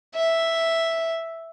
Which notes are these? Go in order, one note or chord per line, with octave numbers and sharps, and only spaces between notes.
E5